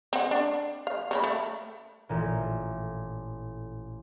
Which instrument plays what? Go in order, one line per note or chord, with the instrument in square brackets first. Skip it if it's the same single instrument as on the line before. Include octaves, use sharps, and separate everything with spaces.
[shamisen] C4 C#4 F#5
D4
F5
C#3 A#3 B5
A3
[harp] A1 A#2